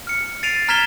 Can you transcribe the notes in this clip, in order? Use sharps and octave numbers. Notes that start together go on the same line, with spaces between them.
F6 C#7
A6 C7 D7 D#7 F7
A#5 F6 G#6 B6 E7 G7